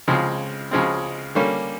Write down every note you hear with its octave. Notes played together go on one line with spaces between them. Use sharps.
C#2 C#3 F3 G#3 C4
C#2 C#3 F3 G#3 C4
D3 G3 A#3 C#4